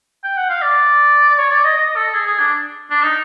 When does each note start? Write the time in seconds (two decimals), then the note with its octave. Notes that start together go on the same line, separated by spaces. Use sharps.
0.24 G5
0.37 F#5
0.50 F5
0.62 D5
1.38 C#5
1.51 D5
1.64 D#5
1.77 D#5
1.96 A4
2.14 G#4
2.27 G#4
2.40 D4
2.90 D4
3.03 D#4